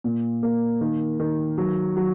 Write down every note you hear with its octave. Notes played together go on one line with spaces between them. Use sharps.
A#2
A#3
D#3
D#3
F#3
F#3